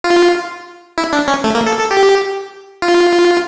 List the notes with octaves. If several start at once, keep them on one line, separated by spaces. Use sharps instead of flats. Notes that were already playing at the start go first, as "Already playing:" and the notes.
F4
E4
D4
C#4
A3
A#3
A4
A4
G4
F4